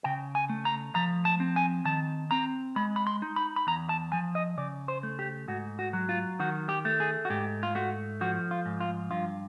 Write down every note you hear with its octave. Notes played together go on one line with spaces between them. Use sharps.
C#3 G5
G#5
A3
A#5
F3 A#5
A5
C4
G#5
D#3 A5
C4 A#5
G#3 B5
B5
C6
D#4
B5
B5
E2 A#5
A5
F3 G#5
D#5
C#3 D5
C5
A3
G4
G#2 F#4
F#4
F#3
F4
D#3 F#4
G4
A3
G#4
F#4
G#2 G4
F4
A3 F#4
F3 F#4
F4
G#2
F4
G2 F4